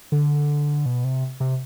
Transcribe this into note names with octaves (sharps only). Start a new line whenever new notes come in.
D3
B2
C3
C3